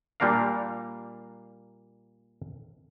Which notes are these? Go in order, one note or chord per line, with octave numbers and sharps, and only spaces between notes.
A#2 G3 A#3 D4 A#4 F5